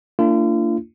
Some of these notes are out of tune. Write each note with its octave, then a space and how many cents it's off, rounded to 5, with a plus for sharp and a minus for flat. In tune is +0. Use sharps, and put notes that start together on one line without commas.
A#3 -45 D4 +0 F4 -40